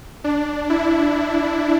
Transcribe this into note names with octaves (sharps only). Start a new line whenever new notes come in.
D4
E4